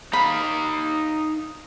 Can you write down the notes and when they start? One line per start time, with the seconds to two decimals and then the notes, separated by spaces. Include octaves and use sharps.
0.13 D#4 F5 B5